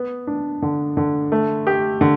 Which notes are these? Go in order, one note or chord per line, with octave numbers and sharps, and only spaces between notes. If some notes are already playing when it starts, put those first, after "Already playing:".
Already playing: B3
D4
D3
D3
A3
G4
D3